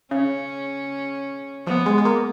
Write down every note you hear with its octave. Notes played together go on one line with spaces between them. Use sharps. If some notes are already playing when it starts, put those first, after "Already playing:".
C#3 C#4
F3 B3
G#3
G#3
A#3